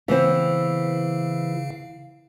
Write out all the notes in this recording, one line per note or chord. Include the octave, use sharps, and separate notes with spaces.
C#3 E3 B3 C4 F5